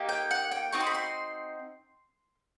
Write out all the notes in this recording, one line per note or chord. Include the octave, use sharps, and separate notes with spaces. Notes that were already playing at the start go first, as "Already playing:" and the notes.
Already playing: A#3 D#4 G4
G5
F#5
G5
C4 D#4 F#4 C#6
C6
B5
C6